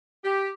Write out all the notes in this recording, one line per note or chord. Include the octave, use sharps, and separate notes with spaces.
G4